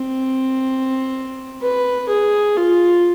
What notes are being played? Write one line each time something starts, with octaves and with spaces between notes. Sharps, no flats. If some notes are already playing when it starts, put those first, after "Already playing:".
Already playing: C4
B4
G#4
F4